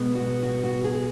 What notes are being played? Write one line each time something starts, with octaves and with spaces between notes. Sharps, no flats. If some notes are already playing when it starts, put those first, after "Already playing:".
Already playing: B2 G#3 B3
F#4
F#4
F#4
G#4